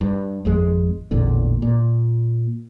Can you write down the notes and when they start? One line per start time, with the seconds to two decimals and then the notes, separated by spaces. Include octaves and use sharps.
0.01 G2
0.45 G#1 F2 G#3
1.11 A1 E2 A#2 D3
1.62 A#2